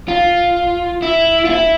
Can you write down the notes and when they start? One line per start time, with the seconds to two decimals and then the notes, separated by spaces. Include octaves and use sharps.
0.08 F4
1.02 E4
1.45 F4
1.50 E4